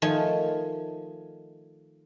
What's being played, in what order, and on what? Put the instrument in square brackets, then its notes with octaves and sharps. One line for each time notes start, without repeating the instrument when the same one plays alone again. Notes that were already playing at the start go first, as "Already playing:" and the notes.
[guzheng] D#3 F3 A3 G#5